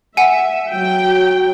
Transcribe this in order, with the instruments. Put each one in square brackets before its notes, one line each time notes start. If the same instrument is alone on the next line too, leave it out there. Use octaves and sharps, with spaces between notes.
[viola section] E5 [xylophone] F#5 G#5
[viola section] F#3 G5